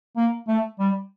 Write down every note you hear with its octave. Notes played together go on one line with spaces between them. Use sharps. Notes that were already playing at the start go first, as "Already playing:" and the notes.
A#3
A3
G3